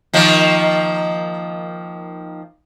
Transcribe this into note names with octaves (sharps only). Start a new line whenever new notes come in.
D#3 F3 A#3